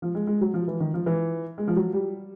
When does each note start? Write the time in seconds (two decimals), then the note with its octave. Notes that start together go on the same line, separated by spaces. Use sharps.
0.02 F3
0.15 G#3
0.27 G#3
0.41 F#3
0.54 F3
0.68 E3
0.80 D#3
0.94 F3
1.06 E3
1.58 G#3
1.67 F3
1.76 F#3
1.93 G3